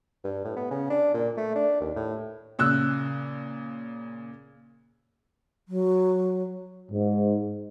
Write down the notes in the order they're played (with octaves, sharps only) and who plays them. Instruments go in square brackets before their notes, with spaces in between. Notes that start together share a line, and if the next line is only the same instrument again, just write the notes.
[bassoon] G2
A2
B3
C#3
D4
A#2
A3
D4
D#2
A2
[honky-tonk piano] A#2 C#3 E6 F#6
[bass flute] F#3
[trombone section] G#2